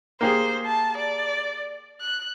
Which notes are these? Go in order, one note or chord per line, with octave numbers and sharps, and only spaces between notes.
A#3 G4 G#4 C5
A5
D5
F#6